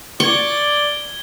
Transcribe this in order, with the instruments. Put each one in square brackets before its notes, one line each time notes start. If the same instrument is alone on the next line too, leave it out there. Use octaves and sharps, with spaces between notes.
[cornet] D5 [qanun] C#6 [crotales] G#6 G7